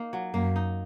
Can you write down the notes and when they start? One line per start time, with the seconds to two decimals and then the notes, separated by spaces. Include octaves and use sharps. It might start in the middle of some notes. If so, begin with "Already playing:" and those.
Already playing: A#3 D#4
0.13 F#3
0.34 F#2 A#3
0.56 D#4